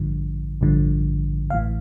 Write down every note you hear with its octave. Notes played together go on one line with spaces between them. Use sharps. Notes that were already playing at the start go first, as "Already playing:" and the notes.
Already playing: A1 G2 D3 F3
A1 G2 D3 F3
A1 A2 E3 F5